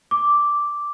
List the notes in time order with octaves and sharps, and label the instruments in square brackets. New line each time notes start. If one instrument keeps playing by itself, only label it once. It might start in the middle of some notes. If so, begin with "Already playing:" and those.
[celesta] D6